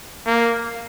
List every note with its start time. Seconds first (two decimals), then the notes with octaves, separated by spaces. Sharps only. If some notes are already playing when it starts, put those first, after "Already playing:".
0.26 A#3